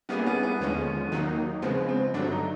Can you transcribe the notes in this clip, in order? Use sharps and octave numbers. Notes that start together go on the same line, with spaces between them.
G3 A#3 B3 C#4 E4 G#4
B3
B3
D#2 D3 F3 G#3 C#4
D#2 D#3 F#3 A#3 D#4
C#3 F3 G#3 B3 C4
C4
G2 D3 F#3 A3 D4
D#4